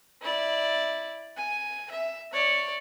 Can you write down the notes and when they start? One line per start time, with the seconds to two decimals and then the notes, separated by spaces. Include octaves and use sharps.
0.21 E4 D5
1.37 G#5
1.91 E5
2.33 C#5 D5